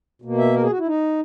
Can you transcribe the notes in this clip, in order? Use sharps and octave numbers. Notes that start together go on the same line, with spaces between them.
B2 A#3
E5
A#4
G#4
F#4
E4
D#4